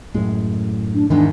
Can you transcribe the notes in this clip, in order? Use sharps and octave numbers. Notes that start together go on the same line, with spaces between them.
F#2 A2 G#3
D4
E2 G#2 D#3 E3 D4